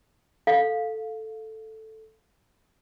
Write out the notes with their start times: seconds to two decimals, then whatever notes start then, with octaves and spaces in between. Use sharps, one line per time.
0.47 A4 F5